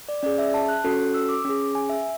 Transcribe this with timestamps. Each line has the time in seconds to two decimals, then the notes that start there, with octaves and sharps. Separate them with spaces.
0.09 D5
0.23 C#4 G#4 D5
0.39 E5
0.54 A5
0.69 F#6
0.84 C#4 F#4 A4
1.14 E6
1.29 D6
1.44 C#4 G#4 D6
1.75 G#5
1.89 E5